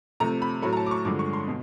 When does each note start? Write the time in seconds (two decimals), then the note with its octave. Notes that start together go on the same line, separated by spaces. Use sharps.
0.20 C3 F3 A3 A#5
0.42 B5
0.62 A2 F#3 A3 B5
0.73 A#5
0.77 A5
0.86 D6
0.91 C#6
1.05 G2 D3 F3 G#3 D6
1.19 C#6
1.33 C6
1.47 B2